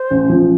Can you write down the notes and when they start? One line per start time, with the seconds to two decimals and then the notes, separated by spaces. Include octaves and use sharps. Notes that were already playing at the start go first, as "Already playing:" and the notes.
Already playing: C5
0.11 A1
0.30 F3